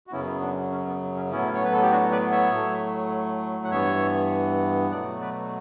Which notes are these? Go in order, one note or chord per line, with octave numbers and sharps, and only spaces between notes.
F#4
F#2 C#3 F#3 B3 C#4 E4
B3 D4
C#4
B3
C#4
A2 F#3 B3 C#4 E4
C#5
B4
A4
G4
D4 F#4
B4 D5
C#5 E5
A2 F#3 A3
F#5
G2 E3 B3 C#5 E5
B2 F#3 A3 D5 F#5
B4 D5